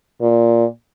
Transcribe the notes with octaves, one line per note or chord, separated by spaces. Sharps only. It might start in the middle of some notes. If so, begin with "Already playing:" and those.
A#2